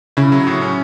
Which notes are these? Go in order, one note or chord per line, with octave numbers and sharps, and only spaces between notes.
C#3 E4
F#3
A2
C#4